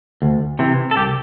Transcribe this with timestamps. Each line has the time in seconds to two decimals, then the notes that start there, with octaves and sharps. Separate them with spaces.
0.22 D2
0.59 C3 E3
0.91 A4
0.96 C2 G4